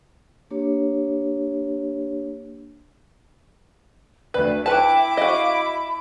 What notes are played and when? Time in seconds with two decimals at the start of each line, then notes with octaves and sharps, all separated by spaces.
0.51 A#3 D4 G4 C#5
4.34 D2 B4 D5
4.66 E4 B4 G5 A5 D6
5.17 F#4 D#5 F5
5.53 B5